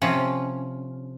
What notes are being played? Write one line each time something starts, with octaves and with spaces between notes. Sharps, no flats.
C3 F3 C#4